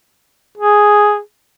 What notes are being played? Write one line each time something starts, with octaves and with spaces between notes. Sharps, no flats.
G#4